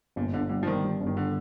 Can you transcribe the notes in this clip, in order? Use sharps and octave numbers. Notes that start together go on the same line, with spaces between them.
G1 A#2
G1 D3
D3 G3
F3
D#3 G3
G3
G1
D#3
D3